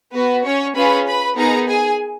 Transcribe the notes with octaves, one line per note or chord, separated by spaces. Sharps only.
B3 F#4 B4
C#4 C#5
C#4 F4 G#4 B4 B5
B4 B5
B3 D#4 G#4 A#4 A#5
G#4 G#5